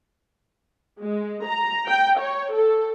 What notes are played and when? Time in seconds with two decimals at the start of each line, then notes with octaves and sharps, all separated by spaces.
1.02 G#3
1.47 A#5
1.88 G5
2.20 C#5
2.53 A4